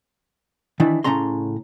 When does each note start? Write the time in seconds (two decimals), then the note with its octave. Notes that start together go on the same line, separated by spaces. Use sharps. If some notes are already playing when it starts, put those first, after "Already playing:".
0.80 D#3 E3 D4 E4
1.04 A2 C#3 C#4 A#5 C6